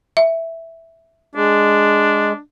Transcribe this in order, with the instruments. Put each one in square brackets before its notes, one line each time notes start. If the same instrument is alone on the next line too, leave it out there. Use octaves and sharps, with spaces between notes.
[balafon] E5
[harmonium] G#3 [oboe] D4